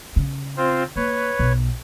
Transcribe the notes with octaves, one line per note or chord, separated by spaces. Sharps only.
C#3
C4 F4 C5
A#3 B4 C#5
B1